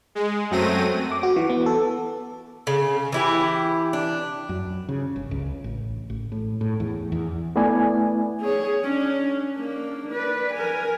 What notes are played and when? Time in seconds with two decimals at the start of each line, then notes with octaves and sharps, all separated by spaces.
0.15 G#3
0.51 F#2 F#3 A3 C4 A#6 D#7
1.12 D6
1.23 F#4
1.36 E3
1.50 B3
1.66 A4
2.67 C#3
3.12 E3 E4 G4
3.93 D4
4.49 F#2
4.89 C#3
5.16 G1
5.31 C#2
5.64 A1
6.10 A1
6.32 A2
6.61 A2
6.80 E2
7.12 E2
7.56 A3 B3 E4 B4 D5 G#5
8.41 G#4 C#5
8.82 C#4 D4
9.56 A#3 D4
10.12 B4 D5
10.53 A#4 G#5